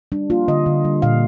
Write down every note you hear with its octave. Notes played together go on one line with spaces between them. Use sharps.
G3 D4
A#3 F4
D3 D#5
D3
G3
A#2 F5